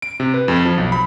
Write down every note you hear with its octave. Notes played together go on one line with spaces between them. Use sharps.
D7
C3
B4
F2
F3
B1
B5